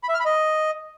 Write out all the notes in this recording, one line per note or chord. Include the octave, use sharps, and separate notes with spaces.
B5
E5
F6
B5
D#5